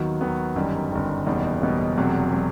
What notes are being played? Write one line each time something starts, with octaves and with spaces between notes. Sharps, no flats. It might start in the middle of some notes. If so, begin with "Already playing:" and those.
Already playing: D#2 D#3 F#3 B3 F#4
D#2 D#3 F#3 B3 F#4
G1 F#2 D#3 G3
G1 F#2 D#3 G3
F#1 E2 B2 G3 D#4
F#1 E2 B2 G3 D#4
E1 E2 C3 F#3
C3 F#3